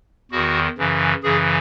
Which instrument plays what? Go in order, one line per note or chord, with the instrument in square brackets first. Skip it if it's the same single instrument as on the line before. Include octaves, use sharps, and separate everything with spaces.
[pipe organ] E2 D#3 F#4
F#2 C#3 E3
F#2 C#3 E3 G#4